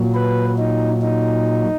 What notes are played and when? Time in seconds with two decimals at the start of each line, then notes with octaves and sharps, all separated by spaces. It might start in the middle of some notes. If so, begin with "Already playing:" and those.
Already playing: A#2 F#3
0.14 B4
0.58 D#4
1.02 D#4